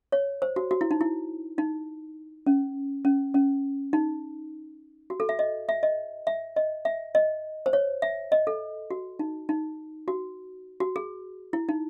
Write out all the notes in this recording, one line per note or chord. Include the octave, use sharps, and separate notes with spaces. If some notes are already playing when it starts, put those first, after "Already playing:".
C#5
C5
F#4
F#4
E4
D#4
E4
D#4
C#4
C#4
C#4
D#4
F#4
A4
E5
D#5
E5
D#5
E5
D#5
E5
D#5
C5
C#5
E5
D#5
A4
F#4
D#4
D#4
F#4
F#4
G#4
E4
D#4